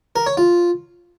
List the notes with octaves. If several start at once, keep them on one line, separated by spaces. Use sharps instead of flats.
A#4
C#5
F4